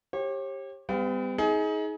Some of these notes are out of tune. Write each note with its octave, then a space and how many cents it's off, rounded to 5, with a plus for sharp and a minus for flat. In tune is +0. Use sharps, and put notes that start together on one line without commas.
G4 +5 C#5 -40
G3 +30 B3 +45 F5 +0
D#4 +30 G#4 +20